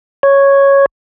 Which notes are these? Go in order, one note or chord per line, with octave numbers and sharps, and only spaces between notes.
C#5